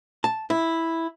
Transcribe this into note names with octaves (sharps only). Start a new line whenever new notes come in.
A5
E4